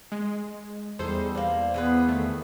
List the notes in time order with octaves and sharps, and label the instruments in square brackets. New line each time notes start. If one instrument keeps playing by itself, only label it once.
[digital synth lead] G#3
[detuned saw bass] E2 [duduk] G3 [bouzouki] D#4 G#4 A4 [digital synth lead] C5
[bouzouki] A#3 D4
[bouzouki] E3 G#4 B4 [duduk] B3
[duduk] D#3 [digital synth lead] A3